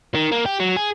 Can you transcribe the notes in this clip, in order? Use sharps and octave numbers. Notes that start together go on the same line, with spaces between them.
D#3
A#3
G4
F#3
G#4